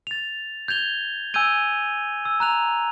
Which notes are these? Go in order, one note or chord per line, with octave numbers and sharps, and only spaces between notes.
A6 F7
G6 G#6 F7 G7
G#5 E6 G6 G#6 D#7 G7
E6
A#5 F#6 F7